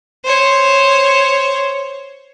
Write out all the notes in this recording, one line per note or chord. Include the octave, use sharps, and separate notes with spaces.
C5 C#5